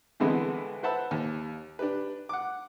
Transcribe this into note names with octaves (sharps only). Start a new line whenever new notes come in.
C2 D3 E3 G#3 B3
B4 C5 E5 F#5 A5 B5
D#2
D4 G4 B4
F#5 D6